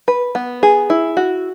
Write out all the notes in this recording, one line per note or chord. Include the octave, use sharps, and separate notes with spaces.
B4
B3
G#4
E4
F#4